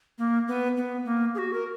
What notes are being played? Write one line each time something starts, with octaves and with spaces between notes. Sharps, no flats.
A#3
B3
B3
A#3
G#4
F#4
A#4